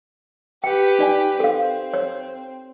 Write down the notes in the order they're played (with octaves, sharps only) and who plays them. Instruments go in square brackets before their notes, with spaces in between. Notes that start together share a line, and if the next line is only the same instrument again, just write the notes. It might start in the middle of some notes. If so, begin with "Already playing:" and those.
[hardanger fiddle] G4 B4 [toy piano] G5
[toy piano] D#4 D5 G#5
[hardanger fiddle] C4 [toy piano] A4 F5
[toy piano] C#5